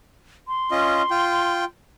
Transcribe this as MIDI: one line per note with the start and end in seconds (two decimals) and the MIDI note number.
0.48 1.61 84
0.71 1.02 61
0.71 1.02 65
0.71 1.02 75
1.11 1.65 65
1.11 1.65 79